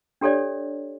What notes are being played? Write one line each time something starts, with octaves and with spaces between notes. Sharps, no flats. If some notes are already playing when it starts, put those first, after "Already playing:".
D4 G4 A4 C#5 D5